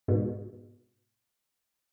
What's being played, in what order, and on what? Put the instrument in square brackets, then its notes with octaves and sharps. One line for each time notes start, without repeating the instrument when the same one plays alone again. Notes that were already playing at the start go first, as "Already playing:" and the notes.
[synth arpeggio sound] G#2 B2